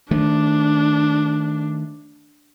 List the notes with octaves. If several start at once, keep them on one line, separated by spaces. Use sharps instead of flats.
D#3 A3 D4